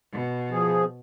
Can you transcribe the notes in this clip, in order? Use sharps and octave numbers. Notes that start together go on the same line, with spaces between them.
B2
F3 G#4